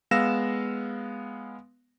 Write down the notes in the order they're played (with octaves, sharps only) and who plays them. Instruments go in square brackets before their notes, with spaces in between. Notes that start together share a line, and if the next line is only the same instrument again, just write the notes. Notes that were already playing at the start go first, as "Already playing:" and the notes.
[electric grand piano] G#3 B3 F5 E6 A#6 E7